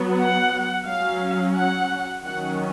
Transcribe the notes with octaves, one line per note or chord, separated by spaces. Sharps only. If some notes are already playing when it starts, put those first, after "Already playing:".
Already playing: F#3 B3
F#5
F#3 C#4 F5
F#5
D#3 F#3 C#4 F#5